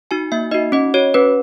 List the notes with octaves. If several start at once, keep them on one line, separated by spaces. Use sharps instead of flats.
D#4 F#4 G#5
A#3 E5
D#4 F#4 D#5
C#4 D#5
F#4 C#5
C#4 B4